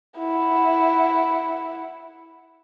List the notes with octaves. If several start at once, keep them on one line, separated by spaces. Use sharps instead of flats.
E4 F#5